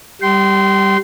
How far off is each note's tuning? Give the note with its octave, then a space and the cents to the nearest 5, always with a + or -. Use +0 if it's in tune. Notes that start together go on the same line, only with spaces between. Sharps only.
G3 +0 G5 -40 C6 -15